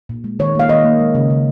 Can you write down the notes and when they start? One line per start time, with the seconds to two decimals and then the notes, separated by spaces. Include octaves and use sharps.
0.09 A#2
0.24 G#3
0.39 D#3 C#5
0.55 A#3 F5
0.69 D#3 D#5
0.84 A#3
1.00 G#3
1.15 C#3
1.30 C#3